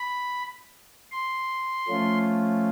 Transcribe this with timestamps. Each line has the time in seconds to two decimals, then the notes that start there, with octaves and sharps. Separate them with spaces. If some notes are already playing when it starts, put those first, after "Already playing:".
Already playing: B5
1.11 C6
1.88 F3 A3 C#4 F4